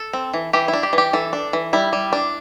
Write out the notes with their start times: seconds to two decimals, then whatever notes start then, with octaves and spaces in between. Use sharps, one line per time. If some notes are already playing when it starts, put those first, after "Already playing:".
Already playing: A4
0.13 C4
0.34 E3
0.53 E3 G4
0.68 E4
0.73 D4
0.83 G4
0.93 E3
0.98 G4
1.13 E3 A4
1.33 D4
1.53 E3
1.73 G3 E4
1.93 G3
2.13 D4